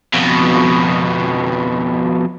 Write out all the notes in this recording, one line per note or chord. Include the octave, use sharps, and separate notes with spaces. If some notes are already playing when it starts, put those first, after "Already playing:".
F2 B2